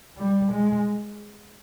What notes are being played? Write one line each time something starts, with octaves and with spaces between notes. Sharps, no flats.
G3
G#3